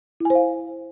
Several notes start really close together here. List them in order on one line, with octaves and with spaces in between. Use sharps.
E4 G#5 C5 F5